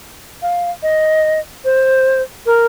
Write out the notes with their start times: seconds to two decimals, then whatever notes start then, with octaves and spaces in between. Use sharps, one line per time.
0.42 F5
0.83 D#5
1.65 C5
2.46 A#4